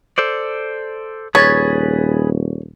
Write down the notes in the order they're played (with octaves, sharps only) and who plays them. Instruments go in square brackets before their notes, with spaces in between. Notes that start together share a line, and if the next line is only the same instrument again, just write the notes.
[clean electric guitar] A4 C5 D5
[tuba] D#1 [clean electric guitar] G#4 B4 [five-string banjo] C#5 [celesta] G#6 A6 B6